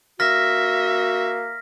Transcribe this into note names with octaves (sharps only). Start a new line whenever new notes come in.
A#3 F#4 E5 F6 A#6 B6